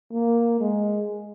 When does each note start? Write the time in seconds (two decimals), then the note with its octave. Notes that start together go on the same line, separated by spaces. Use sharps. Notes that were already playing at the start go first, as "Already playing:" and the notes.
0.12 A#3
0.60 G#3